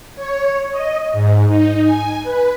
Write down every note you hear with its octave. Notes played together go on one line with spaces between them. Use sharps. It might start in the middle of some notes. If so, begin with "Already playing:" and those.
C#5
D#5
G#2
D#4
G#5
B4